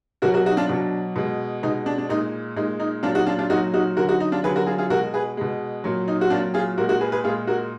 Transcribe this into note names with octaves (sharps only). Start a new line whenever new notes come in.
B2 F#3 F#4 A#4
F#4 A#4
D#4 F#4
D4 F4
B2 F#3 D4
B2 G#3
B2 G#3 D#4
D4
D4
A#2 G#3 D#4
A#2 G#3 D#4
D#4
A#2 F#3 D4 F4
D#4 F#4
D4 F4
D4 F4
A#2 F#3 D#4 F#4
D#4 F#4
D3 F#3 F#4 A#4
D#4 F#4
D#4
D4 F4
D3 F#3 G#4 B4
F#4 A#4
F4 G#4
F4 G#4
B2 G#3 F#4 A#4
G#4 B4
B2 G#3
A#2 F#3
D#4
F#4
A#2 F#3 D4 F4
F4 G#4
A#2 G#3 F#4 A#4
F#4 A#4
G#4 B4
G#4 B4
A#2 G#3 F4 G#4
F#4 A#4